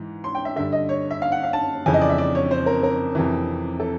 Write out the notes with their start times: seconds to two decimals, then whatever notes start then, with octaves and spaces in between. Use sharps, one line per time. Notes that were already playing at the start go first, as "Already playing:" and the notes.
Already playing: G#2 E3
0.24 C6
0.35 G5
0.45 E5
0.56 G2 D3 E5
0.72 D#5
0.89 C#5
1.11 E5
1.22 F5
1.32 F#5
1.43 F5
1.53 A5
1.86 F2 C#3 E3 G#5
1.94 D#5
2.02 D5
2.10 E5
2.18 D5
2.35 C#5
2.51 C5
2.66 A#4
2.83 A#4
3.15 F2 C3 E3
3.80 A4